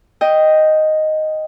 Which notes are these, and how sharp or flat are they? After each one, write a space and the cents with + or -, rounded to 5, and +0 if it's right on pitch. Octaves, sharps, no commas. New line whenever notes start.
D#5 +0 G5 +0